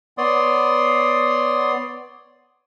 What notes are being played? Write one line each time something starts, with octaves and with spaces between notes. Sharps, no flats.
B3 C#5 D5 C6 D#6